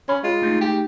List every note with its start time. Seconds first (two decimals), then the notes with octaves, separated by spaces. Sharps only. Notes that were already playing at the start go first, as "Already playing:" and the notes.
0.09 C#4 B5
0.24 G#3 F4
0.42 A3 D#4 G#4
0.61 G4